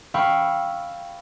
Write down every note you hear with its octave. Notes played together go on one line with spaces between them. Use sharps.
F5 G5 B5 C#6 E6